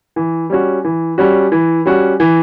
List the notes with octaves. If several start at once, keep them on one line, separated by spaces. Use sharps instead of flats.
E3
G3 C#4 F#4
E3
G3 C#4 F#4
E3
G3 C#4 F#4
E3